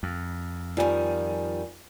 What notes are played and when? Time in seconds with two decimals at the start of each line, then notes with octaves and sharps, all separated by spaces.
0.03 F2
0.77 D#3 F3 G3 G#5